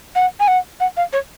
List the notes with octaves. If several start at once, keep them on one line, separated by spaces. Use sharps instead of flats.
F#5
G#5
F#5
F#5
F5
C#5